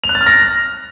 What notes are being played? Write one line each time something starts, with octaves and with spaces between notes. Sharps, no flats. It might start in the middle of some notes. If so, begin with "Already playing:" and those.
F7
F#6
A6
F6
A#6